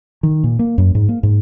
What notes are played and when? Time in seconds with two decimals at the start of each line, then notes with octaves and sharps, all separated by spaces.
0.23 D#3
0.44 A#2
0.59 A#3
0.78 F#2
0.95 G#2
1.09 A#3
1.23 G#2